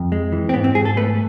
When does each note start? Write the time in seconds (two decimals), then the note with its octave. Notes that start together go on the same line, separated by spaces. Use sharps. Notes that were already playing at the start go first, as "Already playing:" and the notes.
Already playing: F2
0.12 G#3
0.32 E3
0.49 C4
0.54 G#2 B3
0.64 C4
0.75 G#2 G#4
0.85 A4
0.97 A3 B4